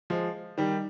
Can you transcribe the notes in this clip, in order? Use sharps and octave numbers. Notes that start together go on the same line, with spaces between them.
F3 G#3
D#3 G3